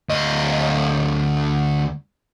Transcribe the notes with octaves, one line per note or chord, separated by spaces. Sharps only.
D2 D#5